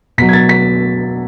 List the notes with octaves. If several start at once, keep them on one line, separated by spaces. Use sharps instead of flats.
B2 F#3 B6
G#6
A6
B6